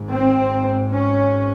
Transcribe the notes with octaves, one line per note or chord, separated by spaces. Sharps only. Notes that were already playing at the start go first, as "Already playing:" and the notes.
Already playing: G#1 G#2
C4
C#4